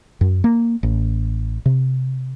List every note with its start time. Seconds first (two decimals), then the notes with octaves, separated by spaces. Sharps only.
0.21 F#2
0.44 A#3
0.83 A1
1.66 C3